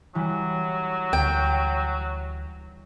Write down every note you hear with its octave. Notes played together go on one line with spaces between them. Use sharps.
E3 F#3 G3
D2 G5